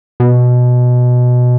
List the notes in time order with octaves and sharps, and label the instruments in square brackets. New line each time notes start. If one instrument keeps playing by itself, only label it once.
[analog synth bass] B2